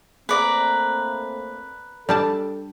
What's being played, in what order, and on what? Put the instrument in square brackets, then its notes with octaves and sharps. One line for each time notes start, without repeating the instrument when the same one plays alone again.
[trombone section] A3 A#3 C4 [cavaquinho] B4 D5 A#5
[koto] G3 D4 A5 [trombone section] A4